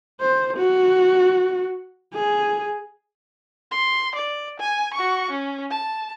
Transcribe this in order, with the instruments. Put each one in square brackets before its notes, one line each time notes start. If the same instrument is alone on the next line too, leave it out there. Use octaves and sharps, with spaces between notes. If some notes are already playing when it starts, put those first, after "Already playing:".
[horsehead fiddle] C5
F#4
G#4
[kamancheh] C6
D5
G#5
F#4 C#6
C#4
A5